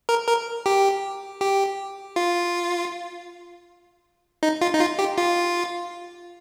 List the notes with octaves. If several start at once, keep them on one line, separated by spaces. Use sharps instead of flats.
A#4
A#4
G4
G4
F4
D#4
F4
D#4
F4
G4
F4